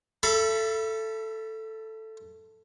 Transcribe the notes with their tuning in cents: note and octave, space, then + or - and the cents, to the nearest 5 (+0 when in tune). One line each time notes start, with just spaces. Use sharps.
A4 +0 E5 +35 B5 -15